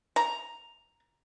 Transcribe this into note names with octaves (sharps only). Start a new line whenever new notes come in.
A#5